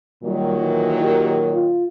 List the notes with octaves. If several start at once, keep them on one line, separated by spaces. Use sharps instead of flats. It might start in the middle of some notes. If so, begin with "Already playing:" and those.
A#2 D#3 F#3 G3
E3
G4
F4